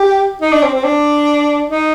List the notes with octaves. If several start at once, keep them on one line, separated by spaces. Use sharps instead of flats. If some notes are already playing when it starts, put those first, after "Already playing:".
Already playing: G4
D#4
D4
C4
C4
D4
D#4